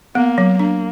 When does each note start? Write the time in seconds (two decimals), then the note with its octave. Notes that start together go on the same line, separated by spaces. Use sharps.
0.15 A#3 B3
0.38 F#3
0.59 A#3 D4